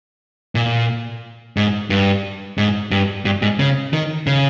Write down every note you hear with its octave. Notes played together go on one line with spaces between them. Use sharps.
A#2
G#2
G2
G#2
G2
G2
G#2
C#3
D#3
C#3